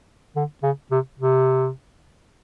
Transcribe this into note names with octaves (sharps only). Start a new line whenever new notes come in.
D3
C#3
C3
C3